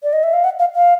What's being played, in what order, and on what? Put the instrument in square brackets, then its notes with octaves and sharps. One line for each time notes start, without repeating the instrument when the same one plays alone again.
[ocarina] D5
D#5
E5
F5
F#5
F5
F5